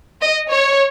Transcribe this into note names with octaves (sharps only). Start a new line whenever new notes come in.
D#5
C#5